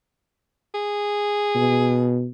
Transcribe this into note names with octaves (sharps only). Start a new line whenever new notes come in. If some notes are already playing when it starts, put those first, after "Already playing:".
G#4
B2